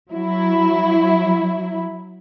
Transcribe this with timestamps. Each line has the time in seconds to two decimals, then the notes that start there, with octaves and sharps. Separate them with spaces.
0.12 F#3 E4